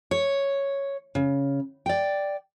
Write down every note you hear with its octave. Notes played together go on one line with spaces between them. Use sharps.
C#5
C#3
D5 G5